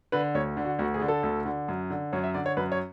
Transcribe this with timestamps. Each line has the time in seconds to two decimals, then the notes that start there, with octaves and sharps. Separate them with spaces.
0.12 D3 B4
0.35 D2 C#5
0.57 D3
0.65 F#4
0.79 D2 F#4
0.94 G#4
1.01 D3
1.08 A4
1.23 D2
1.46 D3
1.68 F#2
1.90 D3
2.13 F#2 C#5
2.24 E5
2.35 D3 D5
2.46 C#5
2.57 F#2 B4
2.72 C#5